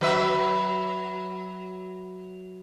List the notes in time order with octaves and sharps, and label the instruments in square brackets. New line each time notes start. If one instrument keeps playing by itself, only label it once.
[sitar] F#3 B4 E5